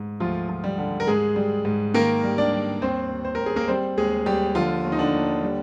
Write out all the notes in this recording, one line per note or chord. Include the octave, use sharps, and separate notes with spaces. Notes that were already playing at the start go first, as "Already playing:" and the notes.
Already playing: G#2
D2 F3 F4
F3
G3 G4
D3
A#4
G#2 G#3 G#4
G3
G#2
D#3 A#3 A#4
G3
D4 D5
G3
D#2 C4 C5
D#2
C5
D#2 A#4
G#4
A#3 A#4
G3 C4 C5
D#2 G#3 G#4
D#2 G3 G4
D3 F3 F4
D#2
D#4
D3 D4
D#2
G3